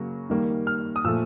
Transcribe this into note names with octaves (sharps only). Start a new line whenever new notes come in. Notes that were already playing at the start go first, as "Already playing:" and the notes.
Already playing: C#3 F#3 A#3
D#3 G3 A#3
F6
D#6
A#2 F3 A3 E6